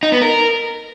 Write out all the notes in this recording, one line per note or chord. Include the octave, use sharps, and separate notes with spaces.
D#4
B3
A#4